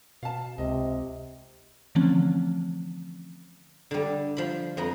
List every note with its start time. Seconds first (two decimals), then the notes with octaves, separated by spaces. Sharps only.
0.23 B2 F5 A5
0.58 C#2 C3 D#5
1.95 D3 E3 F3 A3 C4 C#4
3.91 D3 G3
4.37 F3 B5
4.77 F2 B3 A#5